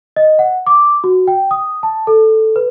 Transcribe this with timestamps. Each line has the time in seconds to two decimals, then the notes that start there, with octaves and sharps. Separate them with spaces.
0.16 D#5
0.39 F#5
0.67 D6
1.04 F#4
1.28 G5
1.51 D#6
1.83 A5
2.07 A4
2.56 B4